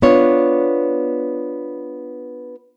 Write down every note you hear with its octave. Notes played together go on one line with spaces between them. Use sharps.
B3 D4 F4 C#5